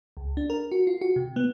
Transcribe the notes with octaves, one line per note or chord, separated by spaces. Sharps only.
C#2
D4
A#4
F#4
F4
F#4
C3
B3